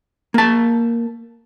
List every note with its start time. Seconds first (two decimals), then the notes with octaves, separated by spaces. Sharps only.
0.34 A#3 A5